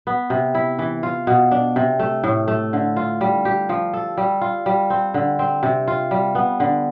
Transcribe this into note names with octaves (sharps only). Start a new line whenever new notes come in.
B3
C3
E4
E3
F4
B2
D4
C3
A3
A2
A3
D3
F4
G3
G4
F3
A4
G3
F4
G3
C4
D3
C4
C3
F4
G3
B3
D3